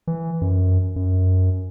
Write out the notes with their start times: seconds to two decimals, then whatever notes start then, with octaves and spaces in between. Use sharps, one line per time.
0.07 E3
0.41 F#2
0.96 F#2